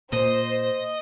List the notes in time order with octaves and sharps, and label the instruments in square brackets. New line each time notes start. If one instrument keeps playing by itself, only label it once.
[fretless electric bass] A#2 [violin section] C5 [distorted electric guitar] D#5